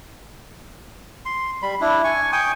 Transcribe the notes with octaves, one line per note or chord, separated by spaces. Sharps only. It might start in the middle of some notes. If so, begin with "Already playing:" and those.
C6
G3 B5
D4 E4
G#5 C#6
G5 G#5 C#6 D#6